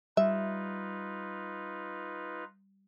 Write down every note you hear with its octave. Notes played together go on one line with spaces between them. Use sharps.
G3 D#4 F4 B4 E5